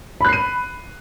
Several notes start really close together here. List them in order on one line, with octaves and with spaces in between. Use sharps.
B5 F#6 C7 D#7